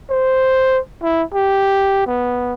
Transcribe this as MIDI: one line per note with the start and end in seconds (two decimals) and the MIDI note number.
0.10 0.79 72
1.03 1.23 64
1.34 2.04 67
2.07 2.53 59